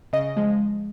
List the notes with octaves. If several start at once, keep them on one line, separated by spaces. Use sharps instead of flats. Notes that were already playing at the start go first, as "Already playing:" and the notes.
C#3 D#5
F3 G#3